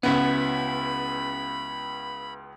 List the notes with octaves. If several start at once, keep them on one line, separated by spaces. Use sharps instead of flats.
C#2 B3 C#4 E4 F#4 B5